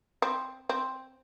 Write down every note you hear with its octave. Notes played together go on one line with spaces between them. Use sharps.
C4
C4